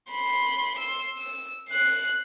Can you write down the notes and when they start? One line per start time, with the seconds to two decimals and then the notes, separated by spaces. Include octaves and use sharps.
0.10 B5 C6
0.78 C6 E6
1.18 E6
1.68 F#6 C7